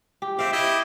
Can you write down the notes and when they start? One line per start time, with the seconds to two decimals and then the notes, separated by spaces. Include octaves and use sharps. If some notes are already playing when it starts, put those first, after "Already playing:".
0.22 G4
0.39 C4 G4 E5 F5
0.52 E4 G4 D#5